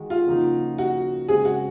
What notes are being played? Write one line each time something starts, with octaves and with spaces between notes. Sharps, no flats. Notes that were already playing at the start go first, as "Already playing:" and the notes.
Already playing: D#3 G#3 F#4
F4
C#3 F3 A#3 D#4 F#4
F#4
C#3 G#3 C4 G#4
F#4